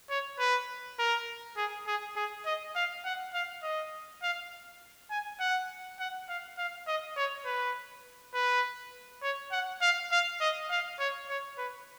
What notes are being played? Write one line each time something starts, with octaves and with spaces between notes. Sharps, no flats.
C#5
B4
A#4
G#4
G#4
G#4
D#5
F5
F#5
F5
D#5
F5
G#5
F#5
F#5
F5
F5
D#5
C#5
B4
B4
C#5
F#5
F5
F5
D#5
F5
C#5
C#5
B4